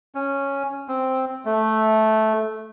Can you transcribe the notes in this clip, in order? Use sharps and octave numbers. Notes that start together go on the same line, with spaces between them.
C#4
C4
A3